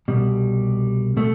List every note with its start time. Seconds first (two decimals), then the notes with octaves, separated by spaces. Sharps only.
0.08 C2 B2 G3
1.17 B2 A3